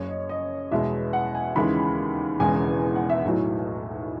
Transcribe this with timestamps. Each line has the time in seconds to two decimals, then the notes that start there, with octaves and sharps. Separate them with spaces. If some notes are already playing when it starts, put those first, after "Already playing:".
Already playing: F#1 F#2 C#3 C#5
0.09 D#5
0.29 D#5
0.71 E2 B2 G#3 E5
1.13 F#5
1.35 G#5
1.56 D#2 C#3 E3 G#3 B5
2.40 E1 E2 C#3 E3 G#3 G#5
2.96 F#5
3.10 E5
3.24 B1 A2 F#3